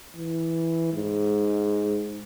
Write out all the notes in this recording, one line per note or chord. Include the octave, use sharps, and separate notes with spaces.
E3
G#2